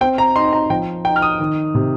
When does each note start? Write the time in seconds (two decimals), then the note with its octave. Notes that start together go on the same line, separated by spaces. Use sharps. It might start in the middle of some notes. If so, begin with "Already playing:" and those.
0.01 C4 G5
0.18 A#5
0.36 D#4 C6
0.53 A#5
0.70 F3 G5
1.05 D#4 G5
1.16 F6
1.22 D#6
1.39 D#3
1.75 C3